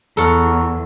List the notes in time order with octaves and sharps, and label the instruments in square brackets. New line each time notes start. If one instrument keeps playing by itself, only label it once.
[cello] E2 [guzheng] A4 F#5 [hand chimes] A#5 C#6 F6